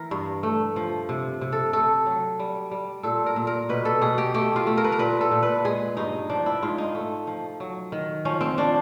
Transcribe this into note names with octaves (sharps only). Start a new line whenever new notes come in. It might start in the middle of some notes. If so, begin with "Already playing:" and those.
Already playing: E3 A#4
G2
A3
F3
C3
C3
A4
A3 A4
F#3
G3
G3
A#2 A4
A#4
A#2
A#4
B2 B4
A4
B2 G#4
G4
A3 G4
F4
A3
A#4
B4
A#4
A#2 B4
A4
A#2
B4
G#3 G#4
G2 D#4
F3 D4
E4
G#2 F4
D#4
A3
F3
F#3
D#3
F3 C#4
C4
F3 D4